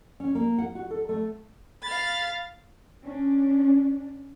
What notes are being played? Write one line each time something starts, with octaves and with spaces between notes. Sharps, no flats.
C#4
A#3
F#5
F#4
A4
A3
F5 B5 A6
C#4 D4